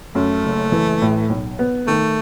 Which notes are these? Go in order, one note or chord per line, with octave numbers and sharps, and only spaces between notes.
F#2 A3
F#1
E3
A2
B1
B3
D#3 A3